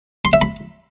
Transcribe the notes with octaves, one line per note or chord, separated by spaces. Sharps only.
C6
E5
B5